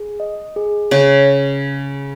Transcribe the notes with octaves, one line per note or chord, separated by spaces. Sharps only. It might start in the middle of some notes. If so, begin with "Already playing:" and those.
Already playing: G#4
D#5
G#4
C#3 C#5